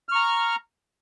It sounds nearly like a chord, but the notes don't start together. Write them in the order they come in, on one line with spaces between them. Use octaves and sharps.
F6 C#6 A#5